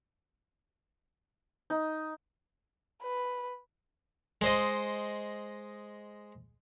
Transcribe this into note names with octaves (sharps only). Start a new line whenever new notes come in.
D#4
B4
G#3 C5 D#5